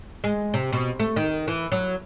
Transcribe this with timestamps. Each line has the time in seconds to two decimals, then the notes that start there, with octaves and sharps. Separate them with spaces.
0.24 G#3
0.54 C3
0.73 B2
1.00 A3
1.16 D#3
1.48 E3
1.72 F#3